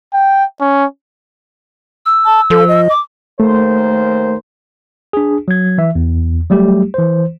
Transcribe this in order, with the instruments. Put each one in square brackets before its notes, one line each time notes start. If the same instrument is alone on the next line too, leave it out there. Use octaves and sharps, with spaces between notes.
[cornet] G5
C#4
[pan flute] E6
[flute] A5
[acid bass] F3 [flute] A4
[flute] D#5
[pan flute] D6
[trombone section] D#2 A#4 C5 [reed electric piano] A3
[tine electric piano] D4 G#4
F#3 G#6
E3 E5
E2
F#3 G3 A3 G4
E3 C5